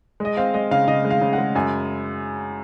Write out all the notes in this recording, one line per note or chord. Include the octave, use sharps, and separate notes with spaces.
G#3 D#5
C4 F5
G#3 D#5
C#3 F5
C#3 D#5
G#3
F5
C#3
F#5
G#3
F#2 G#5